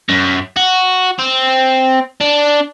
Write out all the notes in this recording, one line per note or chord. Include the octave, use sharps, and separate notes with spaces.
F#2
F#4
C4
D4